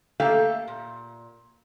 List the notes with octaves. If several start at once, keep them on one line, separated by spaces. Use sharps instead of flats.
A3 A#3 G4 A4 E5 F5
A#2